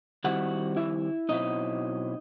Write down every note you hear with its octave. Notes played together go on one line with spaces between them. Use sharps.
D#3 G3 C4 E4 F#4 F#5
E4 E5
B2 F#3 C4 D#4 E4 D#5